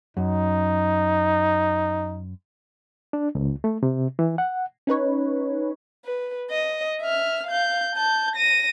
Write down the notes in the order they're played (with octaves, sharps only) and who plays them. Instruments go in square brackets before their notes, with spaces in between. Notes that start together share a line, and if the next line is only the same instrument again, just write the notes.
[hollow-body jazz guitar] F#2 [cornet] D#4
[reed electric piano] D4
C#2
A3
C3
E3
F#5
[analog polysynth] C#4 D#4 B4 C#5
[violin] B4
D#5
E5 F6
F5 G6
A5 G6
A#6 D#7